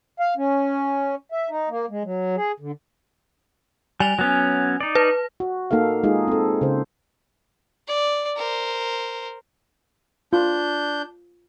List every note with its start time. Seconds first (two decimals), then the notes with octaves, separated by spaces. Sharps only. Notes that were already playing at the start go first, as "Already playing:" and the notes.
0.20 F5
0.37 C#4
1.32 E5
1.50 D#4
1.69 A#3
1.90 G#3
2.04 F#3
2.36 G#4
2.60 D3
4.00 G3 G#5 F7
4.19 F#3 B3 C#4
4.80 D#4 D5
4.95 B4
5.40 F#4
5.71 A#3 D#4 A4 F5
6.03 G#3 D#4 F4 G#4
6.28 C4 A4
6.61 C#3 C5
7.88 D5
8.36 A#4 C5
10.33 D4 F4 G6